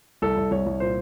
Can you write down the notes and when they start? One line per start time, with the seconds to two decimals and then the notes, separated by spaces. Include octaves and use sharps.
0.22 C2 A4
0.37 C2
0.51 C2 C#5
0.66 C2
0.80 A#2 C5